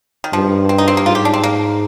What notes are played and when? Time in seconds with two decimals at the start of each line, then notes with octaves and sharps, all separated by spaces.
0.24 D#3
0.33 G2 F3
0.69 C4
0.78 D#4
0.88 C4
0.97 A#3
1.06 G#2 F4
1.15 G4
1.25 D4
1.34 C4
1.44 A#3